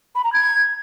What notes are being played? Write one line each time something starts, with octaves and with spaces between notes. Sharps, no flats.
B5
A#5
G#6